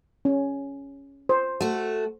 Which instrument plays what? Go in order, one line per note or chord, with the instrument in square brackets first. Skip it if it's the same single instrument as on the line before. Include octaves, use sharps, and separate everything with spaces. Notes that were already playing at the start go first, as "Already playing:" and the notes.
[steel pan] C#4
C5
[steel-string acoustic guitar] A3 F#4